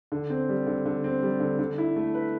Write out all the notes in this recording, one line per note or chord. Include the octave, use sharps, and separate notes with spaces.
D3
C4
G3
D3
D3
C4
G3
D3
D3
E4
A3
B4